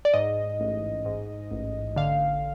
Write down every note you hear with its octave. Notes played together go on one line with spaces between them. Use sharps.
D5
G#2 D#5
A1
G#2
A1
D3 F5